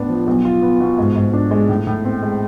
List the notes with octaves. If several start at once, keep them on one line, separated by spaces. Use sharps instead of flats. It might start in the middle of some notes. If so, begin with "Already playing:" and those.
Already playing: A2 B3 D4
F3
B1
F4
B3
B2
G#2
G#2
D4
G#3
A2
A2
C4
G#3